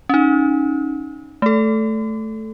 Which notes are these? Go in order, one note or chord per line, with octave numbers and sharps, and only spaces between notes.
C#4 D#4
A3 A4